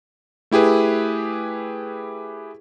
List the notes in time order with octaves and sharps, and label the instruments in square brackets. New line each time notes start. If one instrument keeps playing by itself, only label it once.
[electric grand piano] A3 E4 G4 G#4 B4